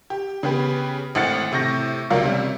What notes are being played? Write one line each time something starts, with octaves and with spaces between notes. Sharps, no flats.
G4
C#3 B3 G4 B4
G#1 A2 F#5 F6 A6 C#7
A2 C3 C#6 G6 A#6
F1 C#2 F#3 A#4 D5 F5
C3 G3 C#4